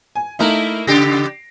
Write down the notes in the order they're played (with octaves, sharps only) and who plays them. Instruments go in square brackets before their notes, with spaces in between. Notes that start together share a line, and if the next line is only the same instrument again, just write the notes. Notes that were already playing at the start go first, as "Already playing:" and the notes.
[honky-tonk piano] G#5
[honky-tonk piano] A3 D#4 [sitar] A#3 E4 A#4
[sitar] C#3 G4 [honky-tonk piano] A#6 C7 D7